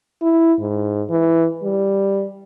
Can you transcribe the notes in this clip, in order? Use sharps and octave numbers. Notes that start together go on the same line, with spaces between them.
E4
G#2
E3
G3